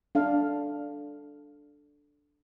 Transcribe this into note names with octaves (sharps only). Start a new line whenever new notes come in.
D4 A4 F5